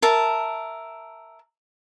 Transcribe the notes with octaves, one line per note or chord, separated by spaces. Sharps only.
A#4 E5 A5